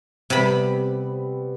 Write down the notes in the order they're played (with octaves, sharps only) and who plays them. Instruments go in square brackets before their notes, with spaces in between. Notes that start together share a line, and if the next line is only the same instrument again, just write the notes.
[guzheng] C3 B5 [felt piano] G3 B3 C4